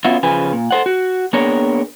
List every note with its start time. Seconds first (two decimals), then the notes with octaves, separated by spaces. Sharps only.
0.04 B3 C#4 F4 F#4 E5
0.23 C#3 F3 B4 G#5
0.53 A#2
0.71 A4 C5 F#5
0.86 F#4
1.33 A#3 B3 D4 G#4 A#4 C#5